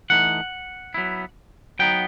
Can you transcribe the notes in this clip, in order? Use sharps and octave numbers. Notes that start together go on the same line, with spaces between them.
E3 A3 D#4 F#5
F#3 B3 E4
F#3 B3 D#4 G5